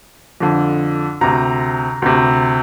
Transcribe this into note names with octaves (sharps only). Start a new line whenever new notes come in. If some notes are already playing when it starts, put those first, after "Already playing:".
F2 D3
D2 C3 A#5
D2 C3